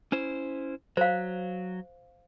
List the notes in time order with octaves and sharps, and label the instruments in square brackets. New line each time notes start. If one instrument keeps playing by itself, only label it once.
[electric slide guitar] C#4 E4 C5
[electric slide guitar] F#3 [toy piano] C5 F5